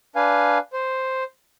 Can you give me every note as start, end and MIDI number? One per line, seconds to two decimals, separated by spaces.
0.16 0.58 62
0.16 0.58 71
0.16 0.58 77
0.16 0.58 80
0.73 1.24 72